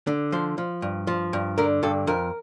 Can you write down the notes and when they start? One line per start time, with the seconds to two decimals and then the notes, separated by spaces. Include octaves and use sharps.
0.07 D3
0.32 F3 C5
0.58 F3
0.82 G2
1.07 F3
1.33 G2
1.58 D3 A#4
1.83 G2 A4
2.07 F2 A#4